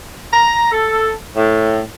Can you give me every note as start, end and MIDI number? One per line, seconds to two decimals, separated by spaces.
0.33 0.69 82
0.72 1.11 69
1.36 1.80 45